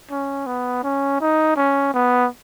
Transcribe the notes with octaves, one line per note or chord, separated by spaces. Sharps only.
C#4
B3
C#4
D#4
C#4
B3